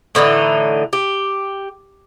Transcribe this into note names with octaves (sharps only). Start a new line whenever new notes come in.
A2 D3 E3 D#4
G4